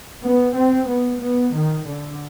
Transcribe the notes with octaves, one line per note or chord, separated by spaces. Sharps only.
B3
C4
B3
B3
D#3
D3